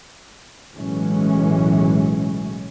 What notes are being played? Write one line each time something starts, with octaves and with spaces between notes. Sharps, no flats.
B1 A2 E3 F#3 G#3 C#4